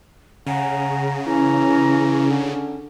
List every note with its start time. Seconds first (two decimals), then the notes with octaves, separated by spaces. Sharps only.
0.47 C#3 F#5 G#5 A#5
1.26 E3 C#4 A#5
2.30 D3